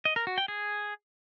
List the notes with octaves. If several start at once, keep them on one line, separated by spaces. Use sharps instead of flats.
D#5
A#4
F#4
G5
G#4